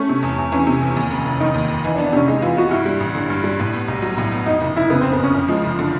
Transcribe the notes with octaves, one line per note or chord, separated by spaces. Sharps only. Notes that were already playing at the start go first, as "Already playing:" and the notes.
Already playing: A3 C#4
C3
E2
E2
E3 C#4
C3
E2
D#2
F1
F1
D#3 D#4
D#2
F1
E3 D#4
D4
B3
D4
C3 C#4
G#3 D#4
E3 F4
B3 F#4
G2 E4
G3
A1
D3
G2
G3
A2
B3
B1
F#3
A2
B3
F2 D#4
F#1 D#4
F#1 E4
C#3 B3
F2 C4
B3
F#1 C#4
F2 C#4
F3 G#3
F#1
D3